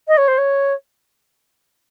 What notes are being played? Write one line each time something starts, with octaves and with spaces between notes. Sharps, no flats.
D#5
C#5
C5
C#5